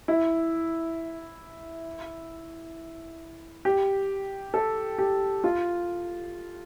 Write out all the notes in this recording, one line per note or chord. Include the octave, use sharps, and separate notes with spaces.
E4
G4
A4
G4
F4